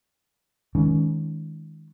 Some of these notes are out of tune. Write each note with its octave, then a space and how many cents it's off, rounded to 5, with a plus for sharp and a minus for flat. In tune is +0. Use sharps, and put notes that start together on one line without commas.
D#3 +25 G#3 +10 C#4 +20